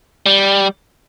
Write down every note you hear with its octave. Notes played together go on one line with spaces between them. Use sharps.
G3